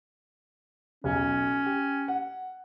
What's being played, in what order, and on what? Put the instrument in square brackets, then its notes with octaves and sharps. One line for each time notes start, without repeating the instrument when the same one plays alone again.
[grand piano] B1 [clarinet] C#4
[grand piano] G4
F#5